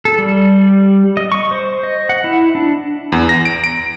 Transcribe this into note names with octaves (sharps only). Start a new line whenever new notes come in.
A4
G3
D#5
C#6
C5
D#5
F#5
E4
D4
E2
A#6
D7
D7